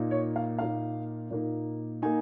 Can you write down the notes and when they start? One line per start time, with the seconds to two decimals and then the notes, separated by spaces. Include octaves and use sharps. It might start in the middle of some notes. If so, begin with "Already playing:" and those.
Already playing: A#2 A#3 D#4
0.11 C#5
0.36 F5
0.59 A#2 A#3 D#4 F5
1.31 A#2 A#3 D#4
2.02 A#3 D#4 G#5